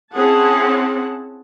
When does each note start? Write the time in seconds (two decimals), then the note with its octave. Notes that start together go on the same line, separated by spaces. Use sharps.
0.14 C4 C#4 E4 G#4 F#5 A5